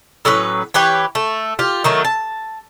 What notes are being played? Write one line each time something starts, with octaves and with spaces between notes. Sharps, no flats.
A2 F#3 C#4 B4
E3 G4 B4 C#5
A3
F4 G4
D#3 F#3 A3
A5